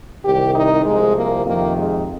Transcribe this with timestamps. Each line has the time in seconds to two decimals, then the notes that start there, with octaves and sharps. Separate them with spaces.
0.24 C2 C3 D#3 G4
0.54 D#4
0.84 C2 C3 F3 G#3
1.15 A#3
1.45 F2 C3 D#3 A#3
1.76 G#3